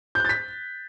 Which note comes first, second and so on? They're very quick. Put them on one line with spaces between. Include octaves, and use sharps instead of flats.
G6 F#6 A6 B6